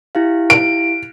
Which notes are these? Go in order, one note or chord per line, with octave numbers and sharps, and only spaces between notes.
E4 G4 F5
D7